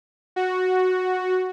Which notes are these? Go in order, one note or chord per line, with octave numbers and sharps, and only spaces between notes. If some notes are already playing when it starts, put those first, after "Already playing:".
F#4